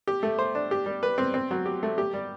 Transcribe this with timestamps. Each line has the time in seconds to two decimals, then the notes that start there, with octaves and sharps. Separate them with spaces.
0.07 G4
0.23 A3
0.39 C5
0.55 D4
0.71 G4
0.86 G3
1.03 B4
1.18 C4
1.34 C4
1.51 F#3
1.66 G4
1.83 A3
1.98 G4
2.13 G3